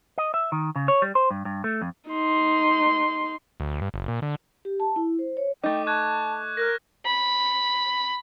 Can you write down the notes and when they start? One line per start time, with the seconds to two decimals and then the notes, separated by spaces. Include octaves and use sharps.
0.18 D#5
0.34 E5
0.52 D#3
0.76 C#3
0.88 C#5
1.02 G3
1.15 C5
1.31 G2
1.45 G2
1.64 A3
1.82 F2
2.10 D#4 C6
3.60 D2
3.81 G2
3.94 F#1
4.08 A#2
4.22 D3
4.65 G4
4.80 A5
4.96 E4
5.19 C5
5.37 C#5
5.64 A3 D#4 G5 D6
5.87 A5 C#6 F#6 G#6
6.57 A#4 F6 F#6 A#6
7.06 B5